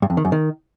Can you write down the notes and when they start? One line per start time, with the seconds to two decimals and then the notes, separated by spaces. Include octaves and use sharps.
0.02 G2
0.10 F2
0.17 D#3
0.25 F#2
0.32 D#3